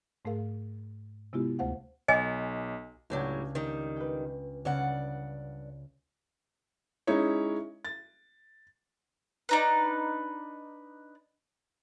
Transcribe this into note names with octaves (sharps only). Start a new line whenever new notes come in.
G#2 A3 G#4 A#4 F5
C3 G#3 B3 E4 F4 G4
D2 A3 C5 F5 F#5
B1 D#5 G#5
C#2 A2 F#3 G3 D4
D#3 G3
B4 G5
G2 C#3 D5 F#5
G#3 C#4 D#4 E4 C#5
A6
D4 D#4 B4